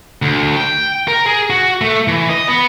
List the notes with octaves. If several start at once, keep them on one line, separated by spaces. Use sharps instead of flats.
D2
G5
A#4
G#4
F#4
A3
E3
D#5
B3